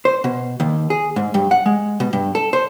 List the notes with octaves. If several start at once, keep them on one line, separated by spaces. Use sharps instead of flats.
C5
B2
D#2
G#4
G#2
G2
F#5
G#3
B2
G2
A4
C5